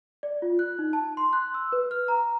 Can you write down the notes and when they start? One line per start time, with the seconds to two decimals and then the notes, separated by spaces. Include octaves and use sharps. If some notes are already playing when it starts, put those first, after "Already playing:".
0.23 D5
0.42 F4
0.59 F#6
0.79 D#4
0.93 A5
1.17 C6
1.33 F#6
1.54 E6
1.72 B4
1.91 F6
2.08 A#5